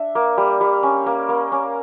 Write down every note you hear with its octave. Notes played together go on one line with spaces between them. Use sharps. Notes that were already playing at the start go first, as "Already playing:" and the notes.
Already playing: D4 E5
A#3
G3
G3
C#4
A#3
A#3
C#4